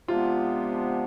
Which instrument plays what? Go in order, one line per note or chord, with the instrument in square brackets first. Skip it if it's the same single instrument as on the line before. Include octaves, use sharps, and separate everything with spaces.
[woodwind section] C3 F3 G#3 B3 D4 [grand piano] F4